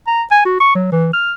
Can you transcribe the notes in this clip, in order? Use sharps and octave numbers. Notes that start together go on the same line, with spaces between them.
A#5
G#5
F#4
C#6
F#3
E3
F6